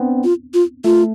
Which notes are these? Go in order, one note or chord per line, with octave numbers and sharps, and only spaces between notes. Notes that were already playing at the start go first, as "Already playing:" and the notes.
Already playing: B3 C4 D4
F4
F4
A3 F4